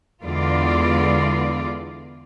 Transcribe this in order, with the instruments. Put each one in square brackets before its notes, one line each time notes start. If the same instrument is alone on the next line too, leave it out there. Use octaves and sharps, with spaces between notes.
[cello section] E2 D3 G#3 F4 D5